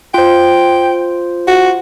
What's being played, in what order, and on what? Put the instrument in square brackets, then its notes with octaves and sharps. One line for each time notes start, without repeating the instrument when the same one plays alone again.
[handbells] F4 C5 [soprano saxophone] G5
[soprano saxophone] F#4